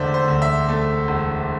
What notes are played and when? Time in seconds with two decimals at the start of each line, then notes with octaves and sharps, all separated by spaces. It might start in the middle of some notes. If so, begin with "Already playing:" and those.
Already playing: E1 D3 A3 C5 D5 E5
0.14 C5
0.28 D2
0.42 E5
0.69 A3
1.08 E1